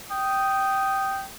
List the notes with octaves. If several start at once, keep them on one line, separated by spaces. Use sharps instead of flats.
G5 D#6